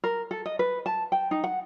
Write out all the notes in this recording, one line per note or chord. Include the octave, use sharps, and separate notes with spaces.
A#4
A4
D#5
B4
A5
G5
D#4
F#5